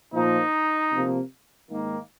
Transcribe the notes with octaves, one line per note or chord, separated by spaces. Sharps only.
A#2 F3 A#3 D#4
C3 F3 A#3
G#2 D#3 A#3